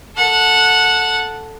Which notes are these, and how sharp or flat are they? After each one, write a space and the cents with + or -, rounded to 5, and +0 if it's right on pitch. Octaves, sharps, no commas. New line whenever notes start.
A4 +0 F#5 -15